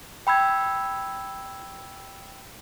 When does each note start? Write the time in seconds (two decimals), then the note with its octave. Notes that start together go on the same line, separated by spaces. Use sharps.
0.27 G5 B5 E6 G#6